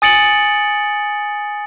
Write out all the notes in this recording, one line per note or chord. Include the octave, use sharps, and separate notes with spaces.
G#5 D#6 A6 C#7 D7 F#7